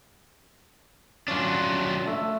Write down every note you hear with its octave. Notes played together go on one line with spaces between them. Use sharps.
F#3 C#4 D4 F4
A3 E5 C6